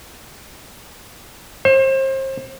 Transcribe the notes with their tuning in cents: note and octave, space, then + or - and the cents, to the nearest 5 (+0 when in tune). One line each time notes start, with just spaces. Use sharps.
C5 +35